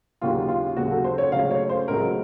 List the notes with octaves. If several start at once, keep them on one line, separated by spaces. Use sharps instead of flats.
D#2 C#3 F#3 A#3 F4
F4
D#2 C#3 F#3 A#3 F#4
A4
C5
C#5
C#2 C#3 F#3 A3 F5
C#5
C5
C#2 C#3 F#3 A3 A#4